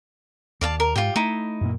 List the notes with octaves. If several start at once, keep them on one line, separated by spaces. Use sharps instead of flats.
D#2 D5 F5 A5
A#4
G#2 F4 G4
A3 D#4 E4
F#2 A#2 A#3